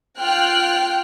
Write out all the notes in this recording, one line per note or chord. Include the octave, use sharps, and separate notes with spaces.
F4 G5 F6 F#6